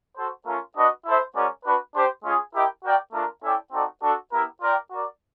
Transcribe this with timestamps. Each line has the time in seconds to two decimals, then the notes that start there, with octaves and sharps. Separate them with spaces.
0.16 F#4 A4 C5
0.45 A3 C#4 F4 A#4
0.76 D4 F#4 B4 D#5
1.06 E4 A4 C5 E5
1.35 G#3 C#4 F#4 A#4 D5
1.65 D4 F#4 B4
1.94 D4 G4 C5
2.23 G#3 C#4 F4 G#4
2.54 E4 G4 A#4 D#5 G5
2.83 F#4 A#4 D5 G5
3.13 A3 D4 F4 A#4
3.43 C#4 E4 A4 D5 G5
3.72 C4 D#4 F#4 A4 D5
4.02 D4 F#4 A4
4.31 B3 E4 G4 A#4
4.62 F4 A#4 D5 G5
4.90 F#4 A#4 D5